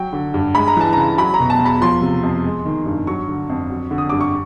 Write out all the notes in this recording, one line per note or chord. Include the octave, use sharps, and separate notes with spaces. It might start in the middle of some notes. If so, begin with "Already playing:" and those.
Already playing: F#3 G5
D3
G2
G#3 B5
A#5
E3 A5
C#3 A#5
F#3 B5
A#5
B2
A5
E2
B5
F3 C6
C3
F2
G#3
D#3
G2
F#3 C#6
D3
F2
F#3
D3
D#6
G2 D6
C#6